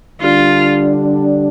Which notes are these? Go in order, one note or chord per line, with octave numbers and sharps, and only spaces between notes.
D3 G3 D4 F4